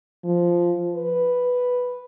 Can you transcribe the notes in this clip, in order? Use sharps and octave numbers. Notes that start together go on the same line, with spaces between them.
F3
B4